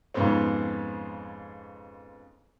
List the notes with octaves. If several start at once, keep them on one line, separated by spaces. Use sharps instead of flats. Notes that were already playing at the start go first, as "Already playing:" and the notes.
F2 G#2 C#3 B3 C4